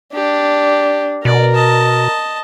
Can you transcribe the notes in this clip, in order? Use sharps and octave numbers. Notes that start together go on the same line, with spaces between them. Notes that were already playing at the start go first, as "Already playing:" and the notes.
D4 G4
B2 A#4 D5
D#5 A5